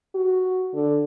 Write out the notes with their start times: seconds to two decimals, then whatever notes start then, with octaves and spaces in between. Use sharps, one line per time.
0.14 F#4
0.74 D3